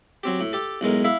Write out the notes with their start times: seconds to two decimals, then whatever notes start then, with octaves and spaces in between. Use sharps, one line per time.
0.23 F#3 C4 G4
0.41 A2
0.53 G4 A4
0.81 B1 A2 G#3 A#4
1.04 E4 E5 F5